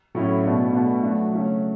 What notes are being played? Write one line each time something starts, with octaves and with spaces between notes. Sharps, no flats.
A2 F#3 C#4 E4
B2 A3 D4 F#4
B2 A3 D4 F#4
F#3 A3 D4 F#4
C#3 F#3 A3 C#4 F#4